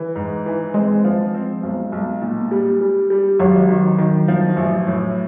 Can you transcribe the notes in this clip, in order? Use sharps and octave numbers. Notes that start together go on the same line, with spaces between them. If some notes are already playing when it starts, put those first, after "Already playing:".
Already playing: E3
G#2
E3
G#3 C4
F3
C4
B1
B1
A#2
G3
G3
G3
G#1 F#3
D#3
D#3
F3
A1
A2